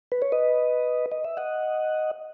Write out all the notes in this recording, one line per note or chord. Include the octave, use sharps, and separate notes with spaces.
B4
C#5
B4 D#5
D#5
E5
D#5 F#5